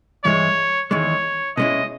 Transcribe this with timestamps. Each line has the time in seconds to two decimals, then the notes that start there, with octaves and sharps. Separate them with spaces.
0.24 G2 E3 G#3 C#5
0.91 E2 D#3 G#3 C#5
1.57 B2 G#3 C#4 E4 D#5